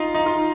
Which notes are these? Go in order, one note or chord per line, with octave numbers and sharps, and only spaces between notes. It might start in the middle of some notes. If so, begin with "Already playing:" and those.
Already playing: D#4 F4
D#4
F4